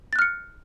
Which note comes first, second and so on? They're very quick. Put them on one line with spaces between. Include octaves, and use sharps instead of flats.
A6 F#6 F6 C#7